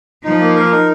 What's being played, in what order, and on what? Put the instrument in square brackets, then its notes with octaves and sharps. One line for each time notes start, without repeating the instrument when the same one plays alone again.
[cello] F3 [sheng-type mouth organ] D#4
[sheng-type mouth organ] A#3
A#4
D#4